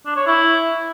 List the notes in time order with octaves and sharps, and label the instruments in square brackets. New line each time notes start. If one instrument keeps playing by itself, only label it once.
[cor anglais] D4
C#5
E4